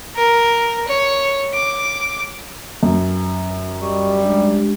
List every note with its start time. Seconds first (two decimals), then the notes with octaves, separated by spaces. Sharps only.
0.15 A#4
0.88 C#5
1.53 D6
2.83 F#2
3.82 G3 D#5 C#6
4.22 G#3 D4 G4